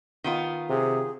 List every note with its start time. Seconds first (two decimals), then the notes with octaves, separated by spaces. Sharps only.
0.24 D#3 B3 F4
0.69 C3 G#4